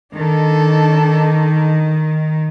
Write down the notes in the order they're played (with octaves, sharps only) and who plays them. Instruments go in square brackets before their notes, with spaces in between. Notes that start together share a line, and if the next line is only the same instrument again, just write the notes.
[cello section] D#3 [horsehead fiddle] D4 A4